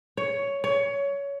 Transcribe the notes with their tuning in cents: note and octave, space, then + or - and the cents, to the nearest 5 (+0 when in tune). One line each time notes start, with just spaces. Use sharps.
C#5 +10
C#5 +20